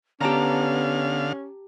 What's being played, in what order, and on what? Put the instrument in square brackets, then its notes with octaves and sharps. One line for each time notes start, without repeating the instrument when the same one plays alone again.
[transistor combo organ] D3 F5 [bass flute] B3 [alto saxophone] C#4 [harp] G4 A5 A#5